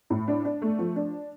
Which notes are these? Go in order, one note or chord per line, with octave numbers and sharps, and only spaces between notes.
A2
D4
D4
A3
F3
D4